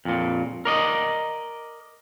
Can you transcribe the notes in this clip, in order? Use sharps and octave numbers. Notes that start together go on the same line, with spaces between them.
F2 A#2
A#4 D5 D#5